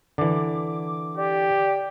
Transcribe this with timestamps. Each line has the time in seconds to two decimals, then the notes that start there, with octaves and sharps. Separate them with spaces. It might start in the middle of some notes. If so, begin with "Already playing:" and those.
0.18 D3 E3 D6
1.17 G4 D5